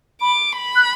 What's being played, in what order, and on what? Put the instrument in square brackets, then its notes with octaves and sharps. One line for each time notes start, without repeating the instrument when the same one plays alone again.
[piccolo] B5 [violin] D6
[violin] B5
[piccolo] F#6